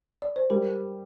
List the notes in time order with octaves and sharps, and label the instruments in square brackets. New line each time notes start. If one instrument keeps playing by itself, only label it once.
[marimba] D5
C5
[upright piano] G3 [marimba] G4 A#4